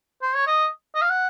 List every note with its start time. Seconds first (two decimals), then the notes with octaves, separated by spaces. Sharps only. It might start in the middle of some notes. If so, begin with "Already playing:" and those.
0.22 C5
0.35 C#5
0.47 D#5
0.95 D#5
1.02 F5
1.10 F#5